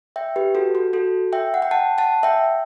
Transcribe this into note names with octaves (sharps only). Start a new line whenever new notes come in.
E5 G5
G4 B4
F#4 A4
F#4
F#4 A4
E5 G5
F#5
G5
F#5 A5
F#5 A5
E5 G5